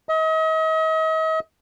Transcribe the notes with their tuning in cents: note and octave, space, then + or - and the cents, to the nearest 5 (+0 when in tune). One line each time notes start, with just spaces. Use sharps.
D#5 +40